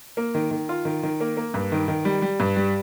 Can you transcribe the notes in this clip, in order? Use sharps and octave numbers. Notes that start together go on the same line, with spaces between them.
A#3
D#3
D#3
F4
D#3
D#3
A#3
A#3
G2
D#3
D#3
G3
G3
G2
G3